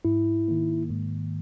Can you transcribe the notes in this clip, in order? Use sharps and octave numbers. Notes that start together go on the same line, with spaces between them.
G#2 E4
D#3 A#3
G#2